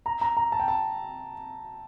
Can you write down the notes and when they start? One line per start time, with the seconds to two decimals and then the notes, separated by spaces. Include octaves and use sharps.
0.06 A#5
0.21 A#5
0.37 A#5
0.52 A5
0.60 G5
0.68 A5